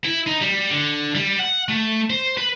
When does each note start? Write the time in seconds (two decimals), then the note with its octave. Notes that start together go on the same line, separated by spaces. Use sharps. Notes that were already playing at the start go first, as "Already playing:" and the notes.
0.04 E4
0.27 D#4
0.41 G3
0.70 D3
1.15 G3
1.39 F#5
1.69 A3
2.10 C5
2.38 B4